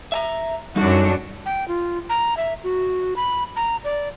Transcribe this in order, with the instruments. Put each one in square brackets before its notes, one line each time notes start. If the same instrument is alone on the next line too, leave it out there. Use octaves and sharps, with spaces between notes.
[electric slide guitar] E5 A5 A#5
[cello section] F#2 D4 F#4 [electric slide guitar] G3 D#4 A4
[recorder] G5
F4
A#5
E5
F#4
B5
A#5
D5